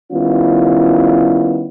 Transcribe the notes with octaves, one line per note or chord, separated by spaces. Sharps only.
D#3 G3 B3 C#4 E4 F4